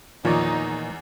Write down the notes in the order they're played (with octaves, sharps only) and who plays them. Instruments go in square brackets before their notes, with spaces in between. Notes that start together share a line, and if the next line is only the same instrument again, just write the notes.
[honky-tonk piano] E2 [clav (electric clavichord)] A#2 C#5 D5 [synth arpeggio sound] D#3 F3 F4 [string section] D#4